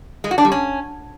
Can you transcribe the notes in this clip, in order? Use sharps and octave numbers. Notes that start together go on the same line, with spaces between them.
G#3
F#4
D4
G3
C#4